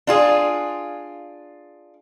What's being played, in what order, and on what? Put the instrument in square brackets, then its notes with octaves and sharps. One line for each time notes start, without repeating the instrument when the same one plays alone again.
[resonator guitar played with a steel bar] D4 F4 G#4